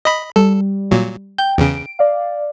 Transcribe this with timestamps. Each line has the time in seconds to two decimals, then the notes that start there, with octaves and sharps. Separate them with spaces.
0.05 D#5 B5
0.36 G3 A4
0.91 A#2 F#3
1.38 G5 G6
1.58 E2 C#3 D7
1.99 D5 F5